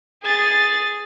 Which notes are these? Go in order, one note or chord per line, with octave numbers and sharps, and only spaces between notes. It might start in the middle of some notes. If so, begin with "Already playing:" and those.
G#4 A6